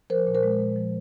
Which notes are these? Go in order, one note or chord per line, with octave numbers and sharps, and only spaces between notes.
F3 A#4 C5
A#2
A#4 C5
G#3
A#2
F3